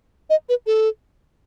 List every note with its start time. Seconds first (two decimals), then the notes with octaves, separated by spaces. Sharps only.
0.30 D#5
0.49 B4
0.66 A4